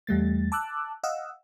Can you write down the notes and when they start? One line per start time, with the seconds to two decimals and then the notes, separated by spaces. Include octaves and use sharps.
0.07 E2 G3 A3 A6
0.52 A5 D6 E6 F#6
1.03 D#5 F5 F#5 E6